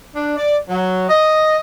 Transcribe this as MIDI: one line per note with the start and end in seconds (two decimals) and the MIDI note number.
0.15 0.36 62
0.37 0.57 74
0.69 1.04 54
1.09 1.59 75